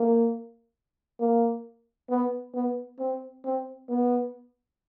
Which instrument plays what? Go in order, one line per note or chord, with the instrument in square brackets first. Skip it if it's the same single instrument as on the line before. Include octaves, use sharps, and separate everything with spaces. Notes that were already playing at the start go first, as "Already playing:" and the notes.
Already playing: [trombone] A#3
A#3
B3
B3
C4
C4
B3